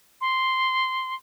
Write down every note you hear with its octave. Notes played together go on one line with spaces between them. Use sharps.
C6